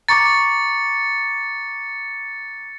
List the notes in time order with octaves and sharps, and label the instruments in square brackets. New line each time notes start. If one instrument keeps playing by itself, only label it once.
[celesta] A#5 C#6 D6 [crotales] A6 C#7